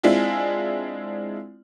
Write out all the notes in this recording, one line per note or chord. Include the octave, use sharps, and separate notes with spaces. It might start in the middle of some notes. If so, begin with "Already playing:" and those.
G#3 C4 D4 E4 F4